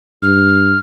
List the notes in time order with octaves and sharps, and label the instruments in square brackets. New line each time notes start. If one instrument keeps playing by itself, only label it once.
[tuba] G2 [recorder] F6